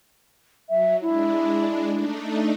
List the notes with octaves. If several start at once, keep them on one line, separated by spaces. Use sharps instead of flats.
F#3 E5
G#3 D4 E4
A3 D4 D#4